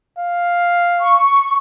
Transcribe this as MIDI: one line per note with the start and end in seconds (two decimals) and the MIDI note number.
0.19 1.21 77
1.01 1.55 85